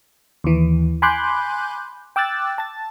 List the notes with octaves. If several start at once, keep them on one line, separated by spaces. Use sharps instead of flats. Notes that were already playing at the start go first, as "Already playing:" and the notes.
D#2 E3
G#5 B5 C6 D6 F#6 G6
G5 D6 E6 F#6 A6
A5 A6